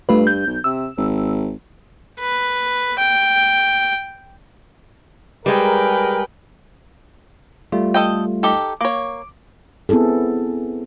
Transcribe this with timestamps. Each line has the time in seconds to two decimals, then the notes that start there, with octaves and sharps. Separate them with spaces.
0.09 G2 A3 F4 B4
0.27 G6
0.47 B1
0.64 C3 E6
0.98 G#1
2.19 B4
2.98 G5
5.46 G3 G#3 G#4 A#4 B4 G5
7.72 G3 A3 F4
7.94 A4 D#5 G5
8.43 D#4 G4 A4
8.81 A#3 C#5 D6
9.89 B3 C4 E4 G#4 A4